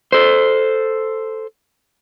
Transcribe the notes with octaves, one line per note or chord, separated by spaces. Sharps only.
A4 C5